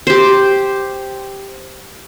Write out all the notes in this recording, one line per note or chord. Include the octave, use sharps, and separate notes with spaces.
G4 C5